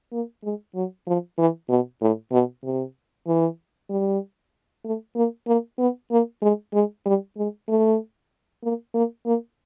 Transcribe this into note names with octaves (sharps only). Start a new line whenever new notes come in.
A#3
G#3
F#3
F3
E3
B2
A2
B2
C3
E3
G3
A3
A#3
A#3
B3
A#3
G#3
G#3
G3
G#3
A3
A#3
A#3
A#3